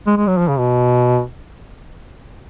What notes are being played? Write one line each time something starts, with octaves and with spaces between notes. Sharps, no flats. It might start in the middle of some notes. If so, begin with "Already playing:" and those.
G#3
G#3
F#3
F3
C#3
B2